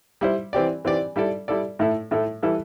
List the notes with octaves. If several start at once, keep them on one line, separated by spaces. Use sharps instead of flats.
G3 E4 C5
E3 C4 G4 D5
E3 C4 G4 D5
G3 E4 A4 D5
G3 E4 A4 D5
A2 A3 E4 A4
A2 A3 E4 A4
E3 G3 E4 A4